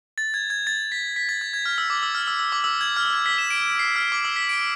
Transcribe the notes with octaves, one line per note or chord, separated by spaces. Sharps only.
A6
G#6
G#6
A6
B6
B6
A6
G#6
G#6
F6
E6
D6
E6
F6
E6
E6
D6
E6
G#6
F6
G#6
B6
E7
D7
D7
C7
F6
D6
E6
B6
D7